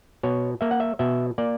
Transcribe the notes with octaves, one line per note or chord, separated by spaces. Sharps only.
B2 C#5
A#3 E5
F#5
E5
B2 E5
A#3 D5